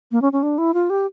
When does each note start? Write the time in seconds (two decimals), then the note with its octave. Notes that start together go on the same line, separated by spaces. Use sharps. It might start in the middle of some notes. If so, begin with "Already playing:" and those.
0.12 A#3
0.22 C#4
0.33 C#4
0.43 D4
0.58 E4
0.74 F4
0.90 G4